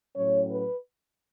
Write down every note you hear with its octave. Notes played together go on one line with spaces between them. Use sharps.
A2 F#3 C#4 C#5
B4